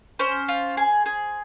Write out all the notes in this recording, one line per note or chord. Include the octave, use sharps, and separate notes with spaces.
C#4 C5
F4
G#4
G#4